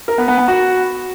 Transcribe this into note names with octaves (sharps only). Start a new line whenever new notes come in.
A#4
B3
B3
B3
F#4